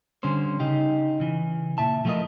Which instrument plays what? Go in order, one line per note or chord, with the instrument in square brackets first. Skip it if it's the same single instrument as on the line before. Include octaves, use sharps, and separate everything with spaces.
[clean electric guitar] D3 G3 C#4 C5
C#3 D#4 G4
C#3 E3
A#2 E5 A5
F3 A3 F4 F#4 A#4 D#5